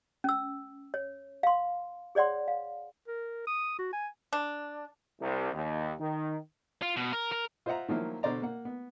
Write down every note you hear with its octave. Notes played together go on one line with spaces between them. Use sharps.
C#4 E6
C#5
F5 C6
G#4 C#5 D5 F#5 C6
F5
A#4
D#6
F#4
G#5
D4
C2
D#2
D#3
F4
B2
A#4
A#4
F4 C5 D#5 E5 F#5 A#5
D#3 F3 F#3 A#3 E4
B2 D3 C5 D5 A#5
A#3 F#5
B3